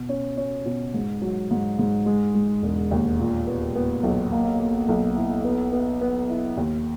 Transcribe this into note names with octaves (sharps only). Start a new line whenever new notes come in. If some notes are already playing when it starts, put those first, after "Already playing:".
Already playing: B2
C#4
C#4
B2
G#2
F#3
G#2
G#2
G#3
G#3
E1
D#2
A#2
B3
B3
B1
A#3
A#3
B1
E4
B3
B3
B3
E4
D#2